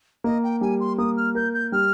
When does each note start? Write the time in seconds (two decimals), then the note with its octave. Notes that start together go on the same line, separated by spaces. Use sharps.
0.24 A#3 D#5
0.43 G5
0.61 G3 G#5
0.80 C6
0.98 A#3 D#6
1.17 F6
1.35 A#4 G6
1.54 G6
1.72 G3 F6